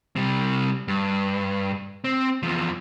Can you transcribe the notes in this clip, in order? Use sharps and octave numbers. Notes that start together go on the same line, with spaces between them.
C3 G3
G2
C4
E2 F3